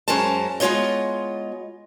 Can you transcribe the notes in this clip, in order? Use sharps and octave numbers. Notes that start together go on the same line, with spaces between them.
F#2 G#3 C#4 A#4 C5 A5
G#3 B3 F4 C#5 D#5